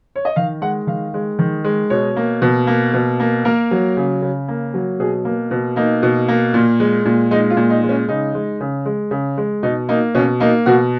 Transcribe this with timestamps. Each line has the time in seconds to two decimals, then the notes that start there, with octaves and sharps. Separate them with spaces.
0.16 C#5
0.25 D#5
0.36 D#3 F5
0.61 G#3 F#5
0.87 D#3 F5
1.14 G#3
1.39 D#3
1.64 G#3
1.90 B2 C#5
2.16 A#3
2.42 B2
2.67 A#3
2.93 B2
3.20 A#3
3.45 A#3 A#4
3.71 F#3
3.97 C#3
4.22 C#3
4.48 A#3
4.74 F#3
5.00 B2 G#4
5.25 A#3
5.51 B2
5.76 A#3 D#4
6.03 B2
6.28 A#3
6.54 A#2
6.80 G#3
7.05 A#2
7.31 G#3 D#4
7.50 F4
7.57 A#2
7.70 D#4
7.83 G#3
7.89 C#4
8.09 C#3 D#4
8.34 G#3
8.61 C#3
8.86 G#3
9.11 C#3
9.38 G#3
9.63 B2 D#4
9.89 A#3 D#4
10.15 B2 C#4
10.40 A#3 D#4
10.66 B2 F#4